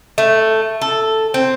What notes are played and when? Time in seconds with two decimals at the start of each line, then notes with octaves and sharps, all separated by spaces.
0.18 A3
0.82 A4
1.34 C4